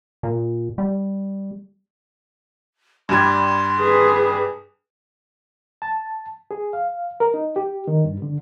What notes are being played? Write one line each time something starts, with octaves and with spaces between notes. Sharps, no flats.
A#2
G3
G2 G3 C6 G#6
G#4 B4
A5
G#4
F5
A#4
D#4
G4
D#3
G2
D3